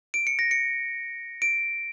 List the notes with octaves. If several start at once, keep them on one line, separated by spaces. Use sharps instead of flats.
D7
C#7
A#6
C#7
D7